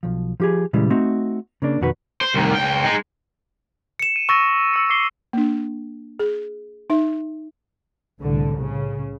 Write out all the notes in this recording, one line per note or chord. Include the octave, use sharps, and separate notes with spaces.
B1 F3
F3 G4 G#4
A#2 C#3 E3 G3 G#3
A3 C4 D#4 F#4
C#3 A#3 D4
F2 B2 D#3 F#4 A4 B4
C5
C2 D#3
C#2 G5
G#3 D#4
C#7 E7
D#7
C#6 E6 A6 A#6 D#7
E6 C#7
D6 C7 G7
A#3 D4
G#4
D#4 E5
C2 A2 D3
C#3